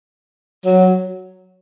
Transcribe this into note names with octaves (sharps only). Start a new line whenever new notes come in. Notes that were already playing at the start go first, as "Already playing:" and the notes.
F#3